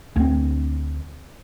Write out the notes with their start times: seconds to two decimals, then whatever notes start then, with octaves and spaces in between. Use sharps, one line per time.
0.16 D2 C4